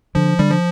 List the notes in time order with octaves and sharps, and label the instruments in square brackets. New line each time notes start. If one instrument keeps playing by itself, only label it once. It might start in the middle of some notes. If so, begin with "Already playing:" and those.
[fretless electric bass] D3 [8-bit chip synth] F3
[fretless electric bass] D3 [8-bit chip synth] G3
[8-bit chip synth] F3